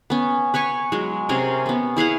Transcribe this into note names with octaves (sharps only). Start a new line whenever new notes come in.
B3 C#4
B4 C#5 G#5 C#6
F#3 G#3
C3 C#4 G#4 A#4
B3 C#4
E4 G#4 F5 F#5